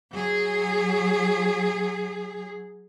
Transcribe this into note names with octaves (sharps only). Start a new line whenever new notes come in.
F#3 G#4